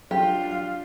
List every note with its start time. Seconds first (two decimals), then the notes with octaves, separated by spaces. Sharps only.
0.11 F#3 D4 F4 G4
0.51 F5